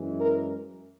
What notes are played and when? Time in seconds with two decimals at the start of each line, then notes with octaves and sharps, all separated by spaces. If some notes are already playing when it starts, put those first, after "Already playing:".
Already playing: F#2 E3 G#3
0.21 A#4